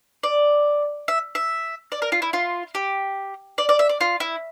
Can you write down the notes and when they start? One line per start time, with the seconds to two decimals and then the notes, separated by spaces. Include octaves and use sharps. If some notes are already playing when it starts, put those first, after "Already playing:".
0.23 D5
1.08 E5
1.35 E5
1.92 D5
2.02 A#4
2.12 F4
2.22 E4
2.33 F4
2.75 G4
3.58 D5
3.69 D5
3.79 E5
3.89 D5
4.01 F4
4.20 E4